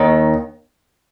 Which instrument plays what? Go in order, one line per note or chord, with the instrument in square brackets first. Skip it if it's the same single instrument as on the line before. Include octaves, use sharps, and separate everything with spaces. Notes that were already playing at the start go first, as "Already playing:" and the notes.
Already playing: [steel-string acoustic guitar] D#2 D#3